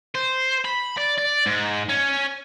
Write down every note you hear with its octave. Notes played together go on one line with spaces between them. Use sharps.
C5
B5
D5
D5
G#2
C#4